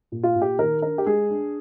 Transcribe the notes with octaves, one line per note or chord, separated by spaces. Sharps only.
A#2
F4
A#2
G4
D#3 A#4
D4 A#4
G4
G#3 G#4
D4